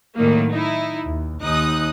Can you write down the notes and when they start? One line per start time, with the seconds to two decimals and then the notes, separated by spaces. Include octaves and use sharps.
0.17 A2 D#3 F#3 A#3
0.52 D#4 E4
1.06 D#2
1.42 D#2 D#4 D#6 F#6